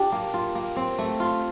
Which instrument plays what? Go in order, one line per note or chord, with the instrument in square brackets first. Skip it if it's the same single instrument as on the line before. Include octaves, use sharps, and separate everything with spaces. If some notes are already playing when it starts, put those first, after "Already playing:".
Already playing: [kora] D4 F4 [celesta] G4 G5
[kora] A#3
F4
A#3
C4
A3
F4